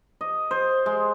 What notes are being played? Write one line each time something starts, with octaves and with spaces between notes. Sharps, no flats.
D#5
C5
G#3